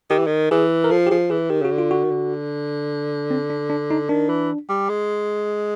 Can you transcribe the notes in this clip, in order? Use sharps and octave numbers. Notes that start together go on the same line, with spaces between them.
D#3 G4
E3
D#3
E3 G#4
A#4
F3 A4
G4
F3 G#4
E3 G#4
D#3 G4
C#3 F#4
D3
F4
F#4
D#3
D3
C4
D4
D4
D#4
D#3 D4
E3
G3
G#3